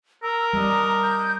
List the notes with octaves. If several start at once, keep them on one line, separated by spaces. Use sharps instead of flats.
A#4 E6
G3 D4 D#5 A#5
G6